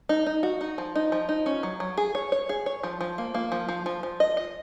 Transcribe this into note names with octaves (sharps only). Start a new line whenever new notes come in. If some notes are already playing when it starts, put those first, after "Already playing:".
D#4
D#4
F#4
D#4
F3
D#4
F3
D#4
C#4
F#3
F#3
G#4
C#5
C#5
G#4
C#5
F3
F3
A#3
A#3
F3
F3
F3
F3
D#5
D#5